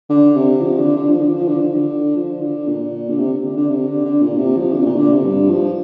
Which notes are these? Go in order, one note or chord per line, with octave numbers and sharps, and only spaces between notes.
D3
C3
F3
D3
D3
F3
D3
F3
D3
F3
D3
F3
D3
A#2
D3
C3
D3
D3
C3
D3
D3
A#2
C3
F3
D3
C3
A#2
D3
C3
G2
F3